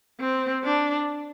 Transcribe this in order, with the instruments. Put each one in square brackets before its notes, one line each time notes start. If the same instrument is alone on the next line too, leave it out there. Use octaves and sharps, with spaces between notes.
[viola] C4
D4